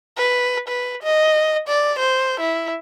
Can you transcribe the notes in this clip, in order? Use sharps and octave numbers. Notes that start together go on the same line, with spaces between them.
B4
B4
D#5
D5
C5
E4